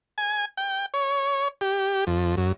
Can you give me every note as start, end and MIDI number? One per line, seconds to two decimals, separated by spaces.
0.18 0.45 80
0.57 0.86 79
0.94 1.48 73
1.61 2.05 67
2.07 2.35 41
2.37 2.52 42